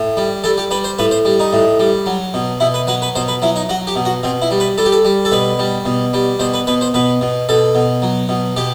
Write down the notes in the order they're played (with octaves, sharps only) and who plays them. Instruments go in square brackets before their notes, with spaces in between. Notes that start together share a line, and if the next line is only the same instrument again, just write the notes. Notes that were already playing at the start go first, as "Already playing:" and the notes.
Already playing: [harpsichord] A2
G3
G3 A4
G4
G3 B4
C5
A2 B4
C5
G3
D#4
A2
G3
F#3
B2
B2 E4
B4
F#3 B4
B4
B2 C5
B4
F#3 E4
D#4
F#3 F#4
G4
B2
F#4
B2 C4
E4
G3
B4
G3 A4
G4
A4
G3
A4
B2 B4
G3
B2
G3
B2 C5
B4
B2 B4
C5
B2 B4
B2
B2 A4
B2
F#3
B2
B2 G4